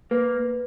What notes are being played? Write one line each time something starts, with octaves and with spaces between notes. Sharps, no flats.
A#3 B4